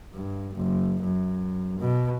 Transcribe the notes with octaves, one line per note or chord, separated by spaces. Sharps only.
G2
F#1
F#2
B2